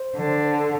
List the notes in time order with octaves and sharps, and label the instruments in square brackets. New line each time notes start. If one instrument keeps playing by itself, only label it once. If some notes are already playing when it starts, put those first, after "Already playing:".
Already playing: [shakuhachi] C5
[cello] D3
[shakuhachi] A4